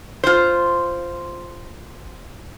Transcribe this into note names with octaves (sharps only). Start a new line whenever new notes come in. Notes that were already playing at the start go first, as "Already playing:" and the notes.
F4 C5